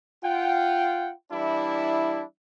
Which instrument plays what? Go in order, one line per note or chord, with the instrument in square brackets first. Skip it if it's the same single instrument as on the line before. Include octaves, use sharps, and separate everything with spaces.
[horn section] F4 F#5 G5
E3 G3 D4 E4